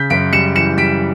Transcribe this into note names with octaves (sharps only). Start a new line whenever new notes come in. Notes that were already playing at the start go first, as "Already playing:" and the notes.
Already playing: C#3 G6 B6
F#2 B6 D7
G3 C#7 E7
E3 C#7 E7
G3 B6 D7